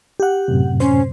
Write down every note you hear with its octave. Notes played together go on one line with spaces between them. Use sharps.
G4 F#5
F#2 A2 C3
C#4 C5